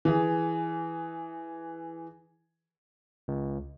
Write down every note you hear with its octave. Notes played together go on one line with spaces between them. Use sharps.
E3 G#4
C#2